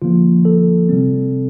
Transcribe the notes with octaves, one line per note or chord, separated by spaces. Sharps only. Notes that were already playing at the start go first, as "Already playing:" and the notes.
D3 F3 A#3 F4
A4
C3 G3 C4